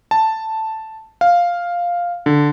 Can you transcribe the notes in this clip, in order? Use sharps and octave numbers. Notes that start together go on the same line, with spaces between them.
A5
F5
D3